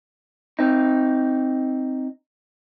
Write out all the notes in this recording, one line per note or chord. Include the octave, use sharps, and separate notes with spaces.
C4 D#4